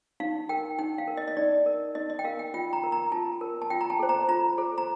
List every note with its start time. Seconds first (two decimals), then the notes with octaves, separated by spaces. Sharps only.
0.20 D#4 F5
0.49 A#4 G5
0.79 D#4 G5
0.98 F5
1.08 A#4
1.17 D#5
1.28 D#5
1.37 D#4 D5
1.66 A#4
1.95 D#4 D#5
2.10 D#5
2.19 G5
2.25 A#4 F5
2.39 G5
2.54 F4 G5
2.73 A#5
2.83 A#4
2.92 A#5
3.12 F4 A5
3.41 A#4
3.62 A5
3.70 F4 G5
3.81 A#5
3.90 A5
3.99 A4 C5
4.09 A#5
4.28 F4 A#5
4.58 A4 C5
4.78 A#5